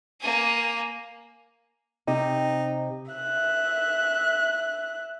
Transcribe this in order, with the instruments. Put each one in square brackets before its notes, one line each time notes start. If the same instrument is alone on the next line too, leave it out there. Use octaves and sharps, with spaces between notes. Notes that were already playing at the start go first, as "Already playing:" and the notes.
[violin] A#3 G#5
[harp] C3 [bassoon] D#4
[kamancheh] E5 F#6